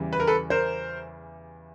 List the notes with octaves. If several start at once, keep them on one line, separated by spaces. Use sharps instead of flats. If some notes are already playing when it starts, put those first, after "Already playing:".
Already playing: E2 C#3 E3 G3
B4
A#4
A4 B4
A#4 C5